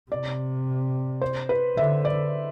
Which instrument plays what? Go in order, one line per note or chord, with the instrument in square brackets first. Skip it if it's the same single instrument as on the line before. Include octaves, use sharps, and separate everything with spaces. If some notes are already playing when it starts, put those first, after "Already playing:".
[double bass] C3 [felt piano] D5
[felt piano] C5
B4
[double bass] D3 [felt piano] E5
[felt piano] D5